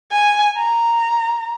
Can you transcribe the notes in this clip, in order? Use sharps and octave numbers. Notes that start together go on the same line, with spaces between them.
G#5
A#5